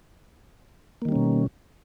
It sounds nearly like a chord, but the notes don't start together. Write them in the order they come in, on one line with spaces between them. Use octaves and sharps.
A#3 D#3 G3 C#4 B2